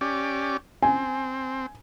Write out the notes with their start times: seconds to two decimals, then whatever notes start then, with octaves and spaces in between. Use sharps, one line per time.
0.01 C#4 G4 D5
0.83 C4 G#5